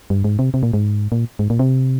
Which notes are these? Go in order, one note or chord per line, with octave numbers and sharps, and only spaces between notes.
G2
G#2
C3
C3
A#2
G#2
A#2
G#2
A#2
C3